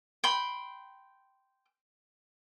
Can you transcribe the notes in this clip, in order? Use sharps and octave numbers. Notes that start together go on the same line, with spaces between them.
G5 B5 C6